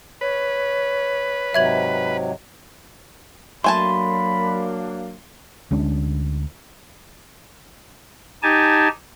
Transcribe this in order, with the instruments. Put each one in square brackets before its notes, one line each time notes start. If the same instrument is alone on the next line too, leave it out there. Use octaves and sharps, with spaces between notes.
[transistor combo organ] B4 [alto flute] C#5
[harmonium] G#2 C3 F#3 [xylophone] E5 G#6 F#7
[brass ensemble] F#3 A#3 D4 [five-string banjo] A3 G#5 A5 [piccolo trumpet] B5 [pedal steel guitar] C6
[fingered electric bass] D2 G#3 C#4 D4
[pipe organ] D#4 G4 G#5 A5